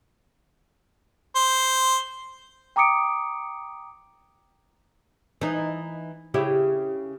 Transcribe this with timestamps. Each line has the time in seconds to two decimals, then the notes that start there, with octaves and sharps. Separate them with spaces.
1.36 C5
2.76 G5 A#5 D6 D#6 C#7 D7
5.41 E3 D#4
6.34 C#3 E4 G4